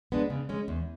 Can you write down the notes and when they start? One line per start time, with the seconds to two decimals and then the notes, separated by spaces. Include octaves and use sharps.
0.12 G#3 B3 D4
0.30 C#3
0.49 G#3 C#4
0.68 E2